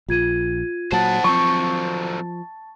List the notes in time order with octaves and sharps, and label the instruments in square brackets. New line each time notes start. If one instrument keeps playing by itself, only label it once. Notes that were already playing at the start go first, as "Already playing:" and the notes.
[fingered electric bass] A#1 [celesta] F4 G#6 D#7
[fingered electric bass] A#2 F#3 [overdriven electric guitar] C5 F#5 [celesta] A5 A6
[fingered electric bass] F3 [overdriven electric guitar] F#3 C4 [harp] C#6